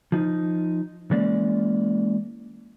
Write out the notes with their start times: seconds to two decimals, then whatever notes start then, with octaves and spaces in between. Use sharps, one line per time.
0.12 F3 D#4
1.11 E3 G#3 A#3 C#4 D5